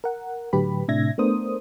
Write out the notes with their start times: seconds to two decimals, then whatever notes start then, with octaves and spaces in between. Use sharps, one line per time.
0.04 A#4 F#5
0.53 A2 D3 F#3 G4 B4 B5
0.88 A2 C3 D4 E5 G#6 A#6
1.18 A3 B3 D4 A#4 C5 D#6